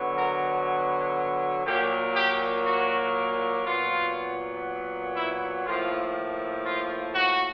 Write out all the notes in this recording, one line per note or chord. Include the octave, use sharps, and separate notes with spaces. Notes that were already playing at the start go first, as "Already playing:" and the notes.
Already playing: D3 F#3 B3
A#4
A#2 F#3 A#3 G4
G4
F#4
A#2 F#3 B3 F4
E4
A2 F3 A#3 F4
F4
F#4